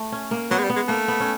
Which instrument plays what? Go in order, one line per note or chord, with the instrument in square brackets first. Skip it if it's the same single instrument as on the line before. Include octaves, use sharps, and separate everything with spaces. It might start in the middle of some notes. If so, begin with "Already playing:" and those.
Already playing: [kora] A3
C#4
A#3
[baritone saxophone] F#3 [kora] B3
[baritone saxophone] G#3
G3
[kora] B3
[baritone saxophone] G#3
[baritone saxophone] A3 [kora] A#3
[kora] B3
C#4